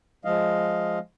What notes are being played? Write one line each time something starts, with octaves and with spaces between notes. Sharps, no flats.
F3 G#3 D#5 F5